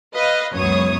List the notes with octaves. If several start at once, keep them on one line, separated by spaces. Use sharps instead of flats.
B4 D#5 F5
C#2 F#2 E3 B3 C#5 D#6